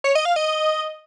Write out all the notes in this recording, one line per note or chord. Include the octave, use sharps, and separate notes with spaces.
C#5
D#5
F5
D#5